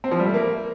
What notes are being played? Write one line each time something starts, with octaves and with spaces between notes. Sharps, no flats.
C4
F3
G3
A3
A#3